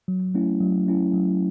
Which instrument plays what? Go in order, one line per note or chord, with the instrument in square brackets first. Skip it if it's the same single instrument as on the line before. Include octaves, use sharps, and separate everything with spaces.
[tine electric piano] F#3
A3 C#4 E4
F#3
A3 C#4 E4
F#3